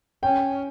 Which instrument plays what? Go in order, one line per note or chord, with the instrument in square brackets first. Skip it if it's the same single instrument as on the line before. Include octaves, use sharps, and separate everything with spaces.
[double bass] C#4 [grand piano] G5